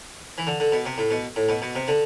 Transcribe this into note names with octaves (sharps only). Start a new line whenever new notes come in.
E3
D3
D3
B2
C3
A2
B2
A2
B2
B2
C3
D3